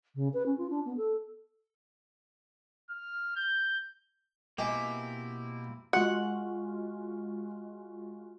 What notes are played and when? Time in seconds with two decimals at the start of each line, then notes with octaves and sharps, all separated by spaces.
0.15 C#3
0.33 B4
0.46 C#4
0.57 F4
0.70 D4
0.85 B3
0.97 A4
2.90 F6
3.36 G6
4.58 B2 A#3 C4 E4 G4 D#5 G#5
5.93 G#3 F4 F#4 F#5